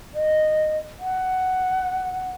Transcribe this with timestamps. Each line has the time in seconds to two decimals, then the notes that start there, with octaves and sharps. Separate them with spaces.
0.14 D#5
1.00 F#5